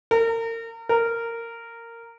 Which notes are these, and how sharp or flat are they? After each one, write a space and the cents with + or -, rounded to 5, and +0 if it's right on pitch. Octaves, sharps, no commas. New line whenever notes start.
A#4 -35
A#4 -15